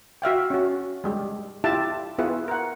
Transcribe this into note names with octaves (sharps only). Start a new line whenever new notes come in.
F#4 E5 F5 G5
C#4 F#4
G3 G#3 G4
E4 F4 G4 E5 A5
B3 E4 F4 G#4 B4
A#4 F#5